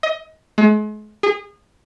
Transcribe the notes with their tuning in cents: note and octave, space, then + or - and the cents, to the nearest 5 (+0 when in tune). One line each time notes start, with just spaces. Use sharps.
D#5 +25
G#3 +40
G#4 -30